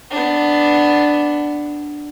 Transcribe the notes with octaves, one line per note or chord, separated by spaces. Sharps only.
B3 D4